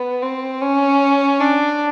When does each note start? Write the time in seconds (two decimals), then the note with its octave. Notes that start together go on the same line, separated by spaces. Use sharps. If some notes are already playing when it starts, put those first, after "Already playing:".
Already playing: B3
0.22 C4
0.62 C#4
1.40 D4